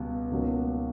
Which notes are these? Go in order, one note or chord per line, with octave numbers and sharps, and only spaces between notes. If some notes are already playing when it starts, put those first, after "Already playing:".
Already playing: C#2 B2 G3
C#2 B2 F#3 A#3 D#4